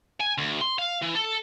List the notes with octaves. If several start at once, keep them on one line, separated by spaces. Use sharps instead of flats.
G#5
D2
C6
F5
E3
A4